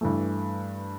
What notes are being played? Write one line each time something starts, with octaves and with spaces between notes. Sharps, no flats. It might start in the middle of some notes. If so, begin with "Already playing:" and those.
G2 E3 A3